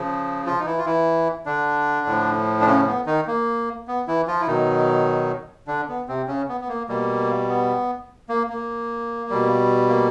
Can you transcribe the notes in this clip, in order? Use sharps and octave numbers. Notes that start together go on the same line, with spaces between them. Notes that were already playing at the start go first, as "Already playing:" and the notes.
Already playing: C#3 F3
F3 F4
D#4
E3 E4
F4
E3 E4
D3 D4
A2 F3
D4
C#3 C#4
B3
D#3 D#4
A#3
B3
E3 E4
F3 F4
E4
B2 D#3 F#3 D#4
D3 D4
B3
C3 C4
C#3 C#4
B3
B3
A#3
B2 G3 A#3
B3
A#3
A#3
B2 G3
A#3